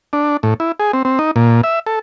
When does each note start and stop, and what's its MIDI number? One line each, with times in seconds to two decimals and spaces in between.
0.13 0.37 62
0.43 0.54 45
0.60 0.72 64
0.80 0.92 68
0.93 1.03 60
1.05 1.19 60
1.19 1.31 63
1.36 1.61 46
1.64 1.79 76
1.87 1.99 69